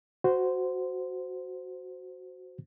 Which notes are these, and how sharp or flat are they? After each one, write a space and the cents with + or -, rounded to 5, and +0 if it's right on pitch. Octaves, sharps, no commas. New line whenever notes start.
F#4 +0 C5 -15